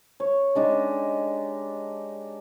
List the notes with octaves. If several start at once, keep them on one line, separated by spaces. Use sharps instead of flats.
C#5
G#3 D4 D#4 G4